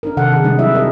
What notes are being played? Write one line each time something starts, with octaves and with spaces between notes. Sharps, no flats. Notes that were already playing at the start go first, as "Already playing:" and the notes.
D4 D#4 A#4
C3 D#3 A4 F#5
D#3 G#4
C3 G3 G#3 D4 D#4
F#3 E4 D#5 E5
E4 G4 G#4 A#4 D#5